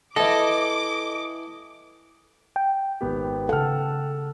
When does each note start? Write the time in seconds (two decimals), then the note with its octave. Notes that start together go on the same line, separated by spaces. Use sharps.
0.16 E3 A4 D#5 F#5 D6
2.56 G5
3.01 G#1 B3 G4
3.49 C#3 A4 F#5 F6